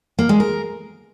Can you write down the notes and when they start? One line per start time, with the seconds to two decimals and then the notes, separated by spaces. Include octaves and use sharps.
0.19 A#3
0.29 G#3
0.40 A#4